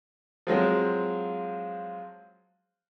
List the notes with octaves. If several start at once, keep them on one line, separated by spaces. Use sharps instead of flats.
F3 F#3 G#3 C4